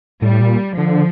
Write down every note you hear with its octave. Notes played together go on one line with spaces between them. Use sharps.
A2 G3
A#2
D3 F3